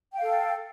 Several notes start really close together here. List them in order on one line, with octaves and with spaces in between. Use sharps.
G5 F5 A4